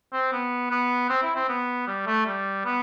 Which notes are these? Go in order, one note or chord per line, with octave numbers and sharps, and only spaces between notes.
C4
B3
B3
C4
E4
C4
B3
G3
A3
G3
B3